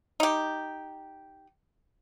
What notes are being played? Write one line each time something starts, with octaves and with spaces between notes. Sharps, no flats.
D#4 G4